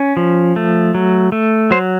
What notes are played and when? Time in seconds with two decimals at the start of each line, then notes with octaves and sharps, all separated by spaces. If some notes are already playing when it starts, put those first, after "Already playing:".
Already playing: C#4
0.17 F3
0.56 A3
0.94 F#3
1.32 A3
1.71 F#3 C5